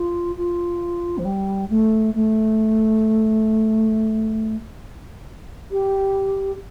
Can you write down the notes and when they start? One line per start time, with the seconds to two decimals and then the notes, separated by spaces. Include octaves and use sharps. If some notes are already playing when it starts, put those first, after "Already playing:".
Already playing: F4
0.36 F4
1.18 F3
1.25 G3
1.70 A3
2.14 A3
5.71 G4